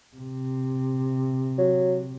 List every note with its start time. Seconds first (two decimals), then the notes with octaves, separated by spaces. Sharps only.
0.16 C3
1.58 F#3